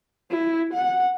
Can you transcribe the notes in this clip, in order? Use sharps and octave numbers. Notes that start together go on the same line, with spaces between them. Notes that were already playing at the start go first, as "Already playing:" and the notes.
E4
F#5